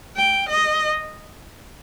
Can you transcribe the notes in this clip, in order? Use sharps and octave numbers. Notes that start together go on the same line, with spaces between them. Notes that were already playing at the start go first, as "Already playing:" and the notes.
G5
D#5